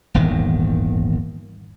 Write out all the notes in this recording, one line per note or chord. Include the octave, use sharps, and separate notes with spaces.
D#1 G#1 E2 D#3